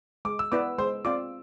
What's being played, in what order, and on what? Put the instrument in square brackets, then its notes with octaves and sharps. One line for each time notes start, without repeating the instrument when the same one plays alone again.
[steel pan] G#3 [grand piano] D6
[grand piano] E6
[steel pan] B3 E4 B4 [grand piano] D5 D6
[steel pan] G#3 [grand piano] C5 C6
[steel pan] C4 F4 [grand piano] D5 D6